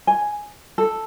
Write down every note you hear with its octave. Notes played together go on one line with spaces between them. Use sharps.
G#5
A4